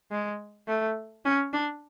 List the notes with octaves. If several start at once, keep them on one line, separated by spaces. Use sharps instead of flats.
G#3
A3
C#4
D4